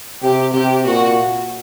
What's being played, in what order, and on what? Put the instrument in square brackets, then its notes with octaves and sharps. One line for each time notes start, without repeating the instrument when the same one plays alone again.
[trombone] C3 [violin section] G4
[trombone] C3 [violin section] G4
[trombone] A#2 [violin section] F#4